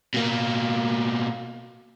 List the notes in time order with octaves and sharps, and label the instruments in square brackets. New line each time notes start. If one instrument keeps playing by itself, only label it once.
[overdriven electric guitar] B2 A#3